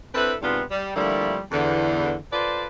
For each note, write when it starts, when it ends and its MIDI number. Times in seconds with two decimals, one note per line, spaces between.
0.15 0.34 60
0.15 0.34 62
0.15 0.34 64
0.15 0.34 69
0.15 0.34 71
0.42 0.61 44
0.42 0.61 48
0.42 0.61 59
0.42 0.61 60
0.42 0.61 62
0.42 0.61 65
0.71 0.94 55
0.95 1.37 50
0.95 1.37 53
0.95 1.37 55
0.95 1.37 57
0.95 1.37 58
0.95 1.37 64
1.52 2.14 40
1.52 2.14 50
2.32 2.67 65
2.32 2.67 69
2.32 2.67 71
2.32 2.67 72
2.32 2.67 74